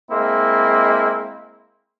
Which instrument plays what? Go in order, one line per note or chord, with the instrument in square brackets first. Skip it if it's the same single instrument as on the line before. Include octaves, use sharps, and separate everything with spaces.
[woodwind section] G#3 A#3 C4 E4